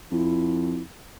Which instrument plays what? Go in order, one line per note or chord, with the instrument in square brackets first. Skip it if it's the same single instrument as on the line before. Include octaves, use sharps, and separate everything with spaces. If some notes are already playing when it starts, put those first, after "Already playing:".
[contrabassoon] F2 [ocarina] E4